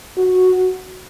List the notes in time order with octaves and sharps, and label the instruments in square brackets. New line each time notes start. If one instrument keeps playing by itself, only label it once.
[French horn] F#4